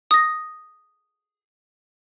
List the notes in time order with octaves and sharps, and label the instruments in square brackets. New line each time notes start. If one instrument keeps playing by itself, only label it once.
[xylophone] D#6 A#6